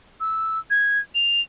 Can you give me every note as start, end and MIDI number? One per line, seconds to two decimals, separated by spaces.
0.20 0.59 88
0.70 0.99 92
1.15 1.41 101